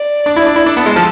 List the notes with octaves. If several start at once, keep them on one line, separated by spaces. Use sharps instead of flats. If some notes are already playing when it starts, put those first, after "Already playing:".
Already playing: D5
D4
E4
D4
E4
D4 A4
B3
G#3
F3